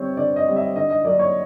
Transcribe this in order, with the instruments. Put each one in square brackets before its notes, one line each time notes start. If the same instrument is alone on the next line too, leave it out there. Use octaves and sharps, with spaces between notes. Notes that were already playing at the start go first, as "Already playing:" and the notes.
Already playing: [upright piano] D3 G3 C4 C5 C#5
D3 D5
D#5
G3 C4
E5
D3 D#5
D#5
F#3 A#3 D4 D5
C#5